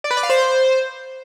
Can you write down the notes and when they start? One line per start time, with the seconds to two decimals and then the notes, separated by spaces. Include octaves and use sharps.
0.04 D5
0.11 B4
0.17 D5
0.23 F5
0.30 C5